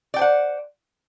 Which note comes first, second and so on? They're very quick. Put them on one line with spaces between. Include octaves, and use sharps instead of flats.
D5 G5 C5 F#5